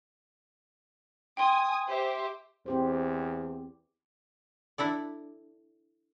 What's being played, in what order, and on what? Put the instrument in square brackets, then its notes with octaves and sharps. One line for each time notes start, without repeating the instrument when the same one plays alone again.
[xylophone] G5 C6 [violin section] G#5 D#6
[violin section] G4 C5 E5
[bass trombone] E2 [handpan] C4 G4 C5
[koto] D4 E4 A4 D5